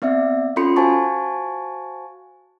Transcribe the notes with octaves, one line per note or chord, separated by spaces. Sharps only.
B3 C4 D5 E5
C#4 F4 A4 B5 C6 C#7
F#4 C5 F5 G#5 A5 C#6